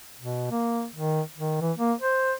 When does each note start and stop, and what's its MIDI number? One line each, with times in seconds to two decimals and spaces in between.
0.19 0.46 47
0.51 0.85 58
0.95 1.21 51
1.37 1.58 51
1.61 1.72 52
1.78 1.93 58
2.00 2.34 72